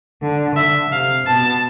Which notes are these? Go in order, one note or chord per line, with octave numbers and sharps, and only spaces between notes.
D3
D3 E5
C3 F5
B2 A5